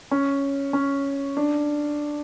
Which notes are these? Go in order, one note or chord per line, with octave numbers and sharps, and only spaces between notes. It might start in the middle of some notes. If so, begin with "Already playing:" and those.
C#4
C#4
D4